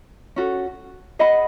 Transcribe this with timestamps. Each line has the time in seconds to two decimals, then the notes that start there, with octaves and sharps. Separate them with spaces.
0.36 C#4 F#4 A4
1.19 G#4 D#5 F#5 B5